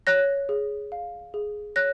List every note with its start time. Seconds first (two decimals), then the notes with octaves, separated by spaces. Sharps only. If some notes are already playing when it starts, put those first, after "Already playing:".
0.07 C#5 F#6 A#6
0.49 G#4
0.92 F5
1.34 G#4
1.76 C#5 F#6 A#6